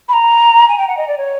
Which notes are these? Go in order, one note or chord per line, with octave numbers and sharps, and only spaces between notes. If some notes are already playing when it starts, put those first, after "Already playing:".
B5
A#5
G#5
G5
F#5
D#5
D5
C#5